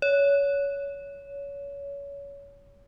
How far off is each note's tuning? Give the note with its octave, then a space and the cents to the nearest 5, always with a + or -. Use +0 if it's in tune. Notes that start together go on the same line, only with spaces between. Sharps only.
C#5 +25